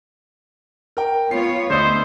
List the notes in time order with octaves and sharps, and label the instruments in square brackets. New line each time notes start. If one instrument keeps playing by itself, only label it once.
[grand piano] A#4 G5
[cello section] B3 F4 C#5 [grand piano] C7
[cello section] D2 B3 [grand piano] D3 D#5 D#6 [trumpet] C5